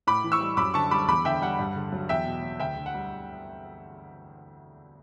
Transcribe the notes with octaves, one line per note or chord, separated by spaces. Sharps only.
A2 B5 D6
E3
C#6 E6
G3
F#2 B5 D6
D3 A5 C#6
G3 B5 D6
E2 B5 D6
D3 E5 G5
G3 F#5
G2
D3
F#3
E2 E5 G5
B2
F#3
D2 E5 G5
D3
F#5
G3